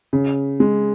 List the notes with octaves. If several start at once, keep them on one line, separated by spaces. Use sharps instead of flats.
C#3
G#3